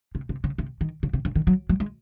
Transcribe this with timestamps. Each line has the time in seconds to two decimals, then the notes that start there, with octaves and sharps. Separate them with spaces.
0.15 C3
0.29 C3
0.44 C#3
0.58 C3
0.81 D#3
1.03 C#3
1.13 C3
1.25 C#3
1.36 D#3
1.47 F#3
1.69 F#3
1.80 G#3